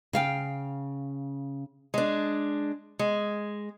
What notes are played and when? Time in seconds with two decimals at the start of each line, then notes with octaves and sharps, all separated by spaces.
0.13 C#3 F5 G5
1.94 G#3 D4
2.99 G#3